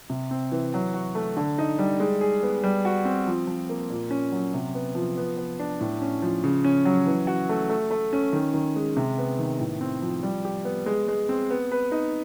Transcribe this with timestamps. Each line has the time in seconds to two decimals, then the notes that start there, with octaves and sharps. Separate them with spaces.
0.10 C3
0.31 C4
0.52 E3
0.74 F#3
0.94 F#4
1.15 A3
1.37 D3
1.58 D#4
1.79 G3
2.00 G#3
2.21 G#4
2.43 B3
2.63 G3
2.85 F#4
3.05 C4
3.27 F3
3.47 F3
3.69 A#3
3.90 A#2
4.11 C#4
4.32 F#3
4.54 C3
4.75 B3
4.95 F3
5.17 B3
5.37 B3
5.59 D4
5.81 A2
6.02 C#4
6.22 F3
6.44 C#3
6.64 C#4
6.85 F#3
7.06 E3
7.27 F#4
7.49 A3
7.69 A3
7.91 A3
8.13 C#4
8.33 D#3
8.54 D#3
8.76 G#3
8.97 C3
9.18 B3
9.39 D#3
9.60 A2
9.81 C4
10.02 F3
10.23 G3
10.45 G4
10.65 B3
10.86 G#3
11.08 G#3
11.29 C4
11.50 B3
11.72 B4
11.92 D#4